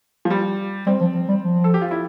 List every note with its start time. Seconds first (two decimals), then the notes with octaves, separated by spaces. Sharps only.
0.25 F3
0.30 G3
0.87 G3 C4
1.01 F3
1.15 F3
1.29 G3
1.43 F3
1.64 A4
1.74 G4
1.82 F4
1.91 E4